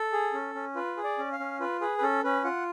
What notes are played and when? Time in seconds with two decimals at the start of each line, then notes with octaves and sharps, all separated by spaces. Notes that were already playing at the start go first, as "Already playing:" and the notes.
Already playing: A4
0.12 G#4
0.34 C#4
0.55 C#4
0.76 F4 B4
0.97 G#4
1.04 D5
1.18 C#4
1.32 F5
1.40 C#4
1.60 F4 B4
1.81 G#4 B4
1.98 B4
2.02 C#4 A4
2.24 C#4 B4
2.44 F4 F#5